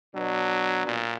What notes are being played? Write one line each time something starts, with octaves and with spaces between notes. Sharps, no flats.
B2 F#3 D4
A#2